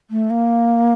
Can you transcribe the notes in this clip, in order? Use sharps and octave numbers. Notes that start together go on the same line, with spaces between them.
A3
A#3